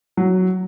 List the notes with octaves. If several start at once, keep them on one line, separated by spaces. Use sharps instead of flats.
F#3